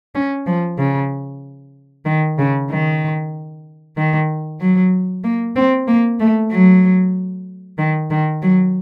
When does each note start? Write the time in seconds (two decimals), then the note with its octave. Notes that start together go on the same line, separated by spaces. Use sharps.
0.15 C#4
0.46 F3
0.78 C#3
2.05 D#3
2.38 C#3
2.70 D#3
3.97 D#3
4.60 F#3
5.24 A#3
5.55 C4
5.87 A#3
6.20 A3
6.51 F#3
7.78 D#3
8.10 D#3
8.42 F#3